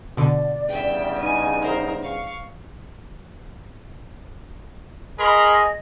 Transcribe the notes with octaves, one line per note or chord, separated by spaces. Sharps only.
B2 D3 D5
E2 G2 C#3 E5 G5
D#4 G#5
A#4 C5
F5 C#6
G#4 A#4 D#5 B5 C6